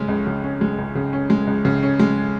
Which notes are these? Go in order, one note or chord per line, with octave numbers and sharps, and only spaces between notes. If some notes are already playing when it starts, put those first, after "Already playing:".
Already playing: C#3 G#3 C#4
C#2
C#3
C#4
G#3
C#2
C#3
C#4
G#3
C#2
C#3
C#4
G#3